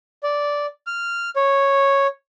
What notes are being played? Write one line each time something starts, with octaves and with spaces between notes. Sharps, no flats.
D5
F6
C#5